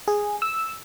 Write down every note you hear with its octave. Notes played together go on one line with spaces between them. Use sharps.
G#4
E6